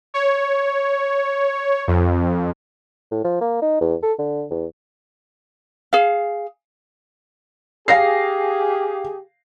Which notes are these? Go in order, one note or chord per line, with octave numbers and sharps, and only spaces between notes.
C#5
F2
A2
F3
A#3
D#4
E2
A4
D3
E2
G#4 F5
G4 G#4 F5 A#6 C7